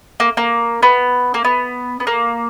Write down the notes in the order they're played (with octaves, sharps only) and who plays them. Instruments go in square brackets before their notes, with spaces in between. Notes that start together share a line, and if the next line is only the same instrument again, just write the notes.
[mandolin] A#3
A#3
B3
A#3
B3
B3
A#3